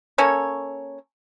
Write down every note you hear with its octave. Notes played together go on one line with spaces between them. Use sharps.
A#3 C#4 A4 C#5